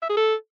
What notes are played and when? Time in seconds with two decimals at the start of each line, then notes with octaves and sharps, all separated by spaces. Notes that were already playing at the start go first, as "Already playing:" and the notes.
0.02 E5
0.10 G#4
0.17 A4